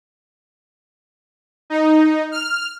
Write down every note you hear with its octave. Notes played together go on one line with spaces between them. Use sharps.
D#4
F6